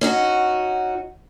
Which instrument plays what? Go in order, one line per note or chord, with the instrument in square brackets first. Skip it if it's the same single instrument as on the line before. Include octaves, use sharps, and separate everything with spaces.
[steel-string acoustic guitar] C#4 D#4 F#4